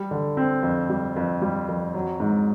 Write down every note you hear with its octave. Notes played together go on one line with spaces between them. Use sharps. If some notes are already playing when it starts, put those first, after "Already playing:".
Already playing: G3
D3
C4
F2
G3
F2
G3
F2
F#3
G#2